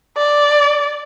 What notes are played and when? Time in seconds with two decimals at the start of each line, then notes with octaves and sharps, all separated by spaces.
0.17 D5